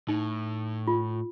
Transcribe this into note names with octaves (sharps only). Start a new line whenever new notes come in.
A2 D#4
F4